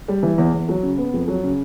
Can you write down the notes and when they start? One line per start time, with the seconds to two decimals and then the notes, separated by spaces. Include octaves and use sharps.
0.08 G3
0.23 E3
0.38 E2
0.53 E2
0.69 F#3
0.83 C#3
0.98 B3
1.13 F2
1.28 F#3
1.43 C#3